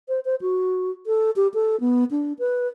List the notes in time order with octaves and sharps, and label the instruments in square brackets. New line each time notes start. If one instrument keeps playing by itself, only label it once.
[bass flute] C5
C5
F#4
A4
G4
A4
B3
D4
B4